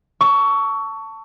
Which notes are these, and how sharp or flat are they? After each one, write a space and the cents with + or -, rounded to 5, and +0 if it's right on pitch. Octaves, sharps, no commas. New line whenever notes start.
A5 +20 C#6 +20 E6 +0